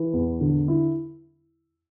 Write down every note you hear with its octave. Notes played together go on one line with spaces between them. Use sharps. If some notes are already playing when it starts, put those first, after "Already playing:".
Already playing: E3
E2
D3
E4